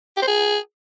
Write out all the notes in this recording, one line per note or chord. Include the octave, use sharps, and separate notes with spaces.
G4
C5
G#4